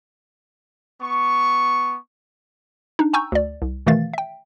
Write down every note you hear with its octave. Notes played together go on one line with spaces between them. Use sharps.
B3 C#6
D4 D#4
G5 G#5 A#5 C#6 E6 G6
D2 D5
C2
B2 D#3 E3 A3 F5 A6
E5 G5